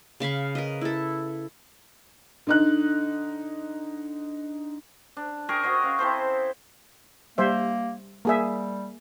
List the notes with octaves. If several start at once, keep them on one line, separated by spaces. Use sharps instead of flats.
C#3 F5 B5 C#6
A#4 B4 D#5
E4 A4
D3 D#4 F#6
D4
G4 G#4 A#4 C#6
F#4 C#5 D#5
C#4 F5
C4 E4 A4 C5
G3 A#3 C5 E5
G3 A#3 G#4 E5